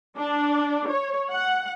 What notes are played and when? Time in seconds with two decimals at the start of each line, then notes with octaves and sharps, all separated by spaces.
0.17 D4
0.89 C#5
1.32 F#5